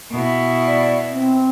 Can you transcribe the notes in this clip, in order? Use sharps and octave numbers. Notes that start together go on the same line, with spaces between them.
B2 E4
D5
C4